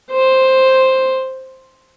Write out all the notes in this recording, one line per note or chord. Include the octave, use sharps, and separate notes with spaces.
C5